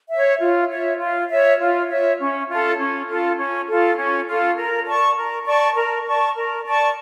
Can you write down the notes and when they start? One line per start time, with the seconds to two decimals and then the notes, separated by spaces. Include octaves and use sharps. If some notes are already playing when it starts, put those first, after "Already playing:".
0.10 E5
0.15 C#5
0.40 F4
0.70 C#5 E5
0.99 F4
1.30 C#5 E5
1.59 F4
1.89 C#5 E5
2.19 C#4
2.49 F4 A4
2.78 C#4
3.09 F4 A4
3.38 C#4
3.67 F4 A4
3.97 C#4
4.27 F4 A4
4.57 A#4
4.87 D5 A5 C#6
5.16 A#4
5.46 D5 A5 C#6
5.75 A#4
6.06 D5 A5 C#6
6.36 A#4
6.66 D5 A5 C#6